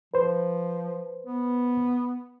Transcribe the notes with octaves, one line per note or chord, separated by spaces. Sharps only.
F3 B4 C5
B3